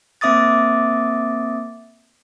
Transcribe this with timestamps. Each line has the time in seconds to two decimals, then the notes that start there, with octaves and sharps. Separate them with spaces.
0.21 A#3 C4 E5 D6 D#6 A6